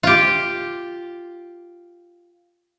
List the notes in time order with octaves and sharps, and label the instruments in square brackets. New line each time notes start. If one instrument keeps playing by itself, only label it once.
[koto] F4 G4